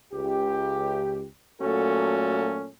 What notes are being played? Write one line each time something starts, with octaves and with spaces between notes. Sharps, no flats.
C#2 G4
A#2 F#3 A3 C#4 F#4 A4